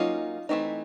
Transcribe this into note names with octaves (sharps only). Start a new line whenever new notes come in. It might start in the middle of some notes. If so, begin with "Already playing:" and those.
Already playing: F#3 A#3 C#4 D#4 F4
E3 A3 C4 D#4